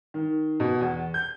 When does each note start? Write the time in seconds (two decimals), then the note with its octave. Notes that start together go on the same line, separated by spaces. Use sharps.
0.14 D#3
0.60 B2
0.81 E2
1.14 G6